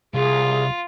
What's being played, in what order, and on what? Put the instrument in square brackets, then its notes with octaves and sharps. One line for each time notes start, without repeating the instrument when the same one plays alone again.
[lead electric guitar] C2 [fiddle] F4 [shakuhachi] G#4